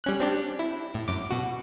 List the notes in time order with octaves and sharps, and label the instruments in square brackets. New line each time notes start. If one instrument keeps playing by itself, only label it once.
[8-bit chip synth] G3 C#4 F#6
C4 D4 G4
E4
A2
F#2 D6
B2 F#4